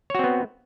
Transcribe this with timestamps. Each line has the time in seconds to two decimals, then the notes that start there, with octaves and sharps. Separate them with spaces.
0.10 C#5
0.15 F#4
0.19 C4
0.24 B3